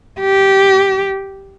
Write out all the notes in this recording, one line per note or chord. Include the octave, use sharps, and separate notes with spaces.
G4